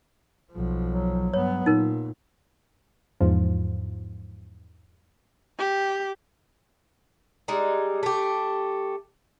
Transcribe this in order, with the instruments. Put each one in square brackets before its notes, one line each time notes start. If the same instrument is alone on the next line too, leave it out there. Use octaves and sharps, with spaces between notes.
[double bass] B1 F3
[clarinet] F#3
[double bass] G2 B3 [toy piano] C#5
[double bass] A#2 [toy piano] D#4 A#4
[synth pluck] E2 G#2 F3
[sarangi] G4
[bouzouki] G3 G#3 D#4
A3 G4